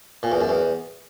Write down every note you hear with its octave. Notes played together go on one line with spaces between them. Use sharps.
A#2
E2
F#2
E2